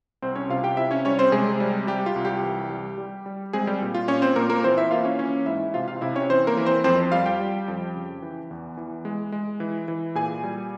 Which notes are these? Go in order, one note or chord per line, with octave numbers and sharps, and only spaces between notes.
C2 C4 C5
C#4 C#5
C3 F4 F5
G4 G5
C3 E4 E5
C#4 C#5
G3 C#4 C#5
C4 C5
C3 G#3 G#4
G3
G3 G4
F4
C2
G3 G4
E3
G3
G3
G3
G#3 C4 G#4
G3 G4
A#2
F4
A#2 C#4 C#5
C4 C5
A#2 A#3 A#4
A#3 A#4
E3 C4 C5
E4 E5
A#3 F4 F5
C#4 C#5
E3 C#4 C#5
G#2 E4 E5
C3 F4 F5
F4 F5
C3 E4 E5
C#4 C#5
E3 C4 C5
A#3 A#4
E3
C4 C5
F2 C4 C5
G3 F4 F5
G4 G5
G3
F2
C#3
E3
E2
E3
G#3
G#3
E3
E3
A#2 G#4 G#5
G3